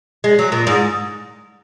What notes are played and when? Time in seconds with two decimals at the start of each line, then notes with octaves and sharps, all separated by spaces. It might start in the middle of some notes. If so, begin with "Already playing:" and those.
0.24 G#3
0.39 F#3
0.52 A#2
0.67 G#2